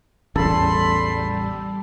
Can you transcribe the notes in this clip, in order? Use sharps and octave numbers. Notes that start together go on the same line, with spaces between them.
A1 E2 C#3 G3 A4 B5 C6